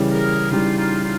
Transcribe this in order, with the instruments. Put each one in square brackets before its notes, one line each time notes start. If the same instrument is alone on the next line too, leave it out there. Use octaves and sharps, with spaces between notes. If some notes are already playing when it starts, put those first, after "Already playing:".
Already playing: [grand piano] C#3 E3 G3
[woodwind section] G#4 A#4
[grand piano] C#3 E3 G3 [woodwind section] D#4 F4
[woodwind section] D#4 F4
D#4 F4